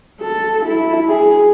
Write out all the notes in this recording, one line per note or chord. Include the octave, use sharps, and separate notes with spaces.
A4
E4
G#4